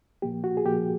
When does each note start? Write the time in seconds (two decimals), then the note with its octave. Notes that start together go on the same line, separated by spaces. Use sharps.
0.22 A#2 F3 A#3 G4
0.44 F#4
0.57 G#4
0.65 A#2 F3 A#3 G4